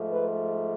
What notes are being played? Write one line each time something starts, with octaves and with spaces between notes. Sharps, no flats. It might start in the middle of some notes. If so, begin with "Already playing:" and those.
Already playing: G#2 F3 A3
B4